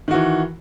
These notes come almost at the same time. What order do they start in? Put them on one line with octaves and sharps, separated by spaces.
D#3 F#4 E3